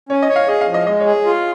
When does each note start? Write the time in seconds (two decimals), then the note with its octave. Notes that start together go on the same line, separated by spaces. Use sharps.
0.09 C#4 C#5
0.22 D#5
0.29 C#5
0.36 F5
0.48 G#4 D#5
0.61 F5
0.68 F3
0.74 D#5
0.87 G#3 D#5
1.00 C#5
1.06 G#4
1.26 F4